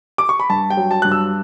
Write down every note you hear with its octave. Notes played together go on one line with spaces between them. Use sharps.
D6
C#6
B5
G2 A5
G5
F#3
A5
G2 F#6
E6